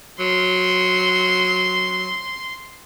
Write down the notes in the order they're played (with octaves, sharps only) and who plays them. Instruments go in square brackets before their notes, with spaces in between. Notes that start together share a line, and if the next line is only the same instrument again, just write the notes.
[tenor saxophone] F#3 [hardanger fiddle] C6